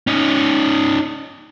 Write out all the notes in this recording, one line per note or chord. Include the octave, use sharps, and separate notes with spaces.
C#4 D#4